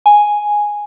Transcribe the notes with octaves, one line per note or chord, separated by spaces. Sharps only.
G#5